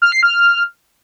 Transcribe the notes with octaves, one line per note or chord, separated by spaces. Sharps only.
F6
C7
F6